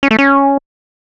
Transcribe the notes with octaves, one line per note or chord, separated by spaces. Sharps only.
C#4
A3
C#4